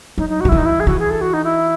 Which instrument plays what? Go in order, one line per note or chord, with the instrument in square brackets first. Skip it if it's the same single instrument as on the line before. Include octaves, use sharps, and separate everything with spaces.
[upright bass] F#3 [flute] D#4
[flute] D#4
F#4
[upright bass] F#3
[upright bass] E3 [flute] E4
[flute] D#4
E4
G#4
[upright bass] E3 [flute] F#4
[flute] G#4
A4
F#4
D#4
E4